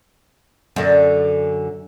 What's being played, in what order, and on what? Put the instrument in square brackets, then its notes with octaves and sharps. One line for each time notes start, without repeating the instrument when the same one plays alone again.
[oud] F#2 D3